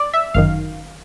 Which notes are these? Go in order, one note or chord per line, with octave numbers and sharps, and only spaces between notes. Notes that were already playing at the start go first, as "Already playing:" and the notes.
Already playing: D5
E5
G1 F#2 D#3 F5